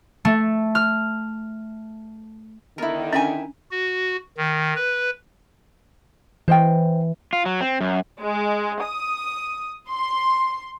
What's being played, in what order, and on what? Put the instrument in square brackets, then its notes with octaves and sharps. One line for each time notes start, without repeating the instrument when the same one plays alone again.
[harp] A3
F6
[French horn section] D3 D#3 [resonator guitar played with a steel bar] B3 [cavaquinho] E4 A#4
[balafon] C#4 D4 [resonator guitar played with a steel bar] E5 G5 G#5
[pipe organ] F#4
D#3
B4
[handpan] E3 [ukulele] C5 D#5 G5
[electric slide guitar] F4
F#3
C4
F#2
[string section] G#3
D#6
C6